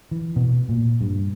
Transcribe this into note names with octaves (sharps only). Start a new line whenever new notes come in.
E3
B2
A#2
G2